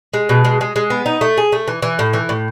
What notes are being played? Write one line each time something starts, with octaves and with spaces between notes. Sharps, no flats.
G#3
B2
G#3
G#3
G#3
B3
D#4
A3
G#4
A3
E3
E3
A2
E3
A2